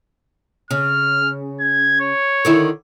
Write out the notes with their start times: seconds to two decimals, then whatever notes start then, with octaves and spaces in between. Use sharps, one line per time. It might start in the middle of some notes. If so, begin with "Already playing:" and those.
0.71 C#3 F6
1.61 G#6
2.00 C#5
2.45 D3 D#3 E4